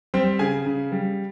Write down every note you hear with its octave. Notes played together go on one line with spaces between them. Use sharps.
G3 C4 C5
C#3 G#4 G#5
C#3
G3